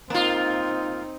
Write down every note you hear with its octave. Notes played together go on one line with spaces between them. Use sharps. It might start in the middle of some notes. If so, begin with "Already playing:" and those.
A#3 C4 D#4 F4